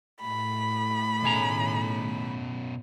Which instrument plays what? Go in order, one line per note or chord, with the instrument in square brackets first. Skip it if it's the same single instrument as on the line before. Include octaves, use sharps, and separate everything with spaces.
[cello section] A2 [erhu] B5
[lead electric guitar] B2 C#4 [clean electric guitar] D#3 G#4 A#5